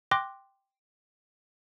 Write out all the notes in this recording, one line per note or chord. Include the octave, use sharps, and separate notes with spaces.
G5 C6 D6 F#6 A#6